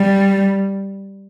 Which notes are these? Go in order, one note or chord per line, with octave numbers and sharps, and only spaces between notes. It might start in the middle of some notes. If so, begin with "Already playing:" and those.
Already playing: G3